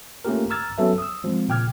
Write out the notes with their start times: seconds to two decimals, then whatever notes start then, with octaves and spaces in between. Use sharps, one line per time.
0.25 A3 A#3 C#4 F4 G4 A#4
0.50 A#5 D6 E6 F6 G#6 A6
0.78 F#3 B3 C#4 A4 B4 E5
0.98 D#6 E6
1.24 F3 G#3 C4
1.48 A#2 C#3 G5 D6 F6 G#6